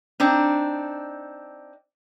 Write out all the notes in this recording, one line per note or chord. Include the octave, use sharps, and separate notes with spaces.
C4 D4 D#4